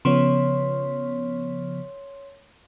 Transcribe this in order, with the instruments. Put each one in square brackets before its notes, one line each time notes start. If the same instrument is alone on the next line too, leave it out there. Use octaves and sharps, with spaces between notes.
[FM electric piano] C#3 F3 B3 [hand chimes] C#5 C6